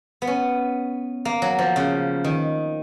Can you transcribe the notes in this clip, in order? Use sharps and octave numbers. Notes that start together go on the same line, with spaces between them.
B3
C#4
A#3
F#3
F3
C#3
D#3